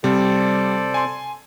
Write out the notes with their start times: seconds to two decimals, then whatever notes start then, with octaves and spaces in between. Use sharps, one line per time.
0.04 C3 G3 A4 C5 D5
0.94 G#5 C6